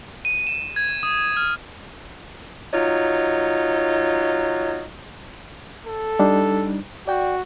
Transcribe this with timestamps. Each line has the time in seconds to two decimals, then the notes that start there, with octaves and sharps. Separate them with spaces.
0.25 D#7
0.47 E7
0.76 G#6
1.03 D#6
1.37 F6
2.73 F#3 D#4 F4 C#5
5.87 A4
6.19 G3 D4 D#4
7.07 F#4 D5 G5